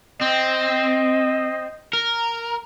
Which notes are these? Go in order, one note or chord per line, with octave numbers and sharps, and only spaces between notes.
C4 D#5
A#4